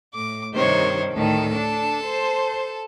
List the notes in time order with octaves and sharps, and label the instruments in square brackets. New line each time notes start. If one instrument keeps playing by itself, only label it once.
[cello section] A2 [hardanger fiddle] D6
[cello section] G2 C3 D#3 [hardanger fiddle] C5 C#5
[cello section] D2 A2 D#3 [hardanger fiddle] A4 A5
[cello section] D4
C5